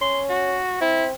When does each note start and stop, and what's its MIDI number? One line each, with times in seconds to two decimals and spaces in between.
0.01 0.57 61
0.01 0.20 84
0.29 0.78 66
0.81 1.12 60
0.81 1.05 64